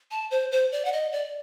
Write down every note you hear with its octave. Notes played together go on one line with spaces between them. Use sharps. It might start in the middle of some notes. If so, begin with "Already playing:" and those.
A5
C5
C5
D5
F#5
D#5
D5